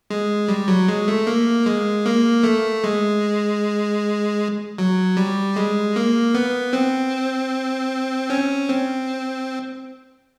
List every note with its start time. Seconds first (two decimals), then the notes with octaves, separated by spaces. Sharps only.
0.10 G#3
0.49 G3
0.68 F#3
0.88 G#3
1.08 A3
1.27 A#3
1.66 G#3
2.06 A#3
2.43 A3
2.84 G#3
4.78 F#3
5.17 G3
5.56 G#3
5.96 A#3
6.34 B3
6.73 C4
8.30 C#4
8.69 C4